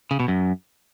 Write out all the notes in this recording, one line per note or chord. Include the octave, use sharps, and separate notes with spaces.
C#3
B2
F#2